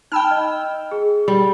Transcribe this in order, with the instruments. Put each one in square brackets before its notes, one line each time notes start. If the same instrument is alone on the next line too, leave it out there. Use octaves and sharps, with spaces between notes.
[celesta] D#4 A5 B5 [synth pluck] G5 E6 F6
[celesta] D#5
G#4
[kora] G3